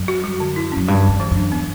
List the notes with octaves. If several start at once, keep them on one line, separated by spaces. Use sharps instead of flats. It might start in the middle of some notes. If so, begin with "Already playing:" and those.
Already playing: F#2
F#4
G3
D3
E4
F#2 C#4
G2 G3
E3
G2
E3
F#2 D4
B3